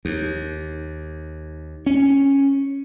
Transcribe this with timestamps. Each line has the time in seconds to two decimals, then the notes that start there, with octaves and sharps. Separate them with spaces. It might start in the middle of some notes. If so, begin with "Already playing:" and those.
0.05 D#2
1.86 C#4